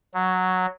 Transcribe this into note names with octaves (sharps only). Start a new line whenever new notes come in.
F#3